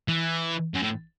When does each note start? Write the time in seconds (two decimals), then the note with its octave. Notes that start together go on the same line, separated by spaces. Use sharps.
0.08 E3
0.74 F#2
0.82 A2